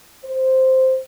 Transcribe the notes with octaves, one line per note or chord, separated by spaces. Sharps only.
C5